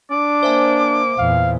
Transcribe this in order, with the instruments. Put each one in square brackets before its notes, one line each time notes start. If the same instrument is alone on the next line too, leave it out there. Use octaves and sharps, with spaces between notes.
[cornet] D4 [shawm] D6
[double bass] A#3 [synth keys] C5 E5 G#5
[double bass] E2 A#2 [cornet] F5